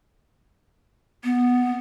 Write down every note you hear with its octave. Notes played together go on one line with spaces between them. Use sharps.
B3